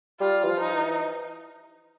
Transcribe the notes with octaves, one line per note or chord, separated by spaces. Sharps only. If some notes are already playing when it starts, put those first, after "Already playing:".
G3 F4
E3
F3
D#4
E3